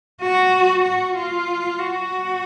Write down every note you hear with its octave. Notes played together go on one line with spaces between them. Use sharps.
F#4
F#4
F4
F#4